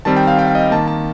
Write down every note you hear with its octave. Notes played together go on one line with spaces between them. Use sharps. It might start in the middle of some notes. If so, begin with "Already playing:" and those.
D#3 G3 C4 A5
G5
F5
G5
F5
D#5
D#3 A#3 A5
A5